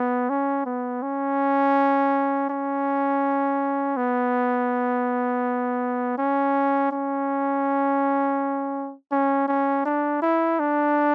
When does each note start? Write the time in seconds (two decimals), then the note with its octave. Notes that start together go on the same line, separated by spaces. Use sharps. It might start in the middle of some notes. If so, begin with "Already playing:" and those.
Already playing: B3
0.30 C#4
0.66 B3
1.03 C#4
2.50 C#4
3.97 B3
6.18 C#4
6.92 C#4
9.12 C#4
9.48 C#4
9.86 D4
10.22 E4
10.59 D4